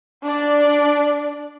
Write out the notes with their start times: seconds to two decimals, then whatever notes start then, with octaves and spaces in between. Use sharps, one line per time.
0.23 D4 D5